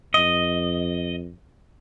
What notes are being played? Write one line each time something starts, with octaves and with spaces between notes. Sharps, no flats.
F2 D#5